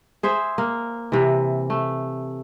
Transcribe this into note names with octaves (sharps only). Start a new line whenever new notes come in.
G#4 C5 E5
A#3
C3 E3
A3